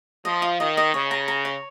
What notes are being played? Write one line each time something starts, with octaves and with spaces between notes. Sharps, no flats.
F3 D#5
F4
D#3 D#5
D#5
C#3 C#5
A#5
A#5
C#5